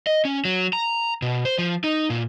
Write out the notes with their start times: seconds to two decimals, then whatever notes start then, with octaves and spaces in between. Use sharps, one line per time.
0.07 D#5
0.25 C#4
0.45 F#3
0.73 A#5
1.22 B2
1.45 C5
1.59 F3
1.84 D#4
2.10 A#2